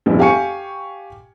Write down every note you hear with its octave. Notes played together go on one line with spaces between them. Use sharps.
A#1 F2 G3 B3 E4
G4 F5 G5 G#5 C#6 C#7